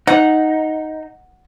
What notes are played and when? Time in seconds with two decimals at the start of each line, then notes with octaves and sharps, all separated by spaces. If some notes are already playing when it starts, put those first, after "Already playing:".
0.07 D#4 F#5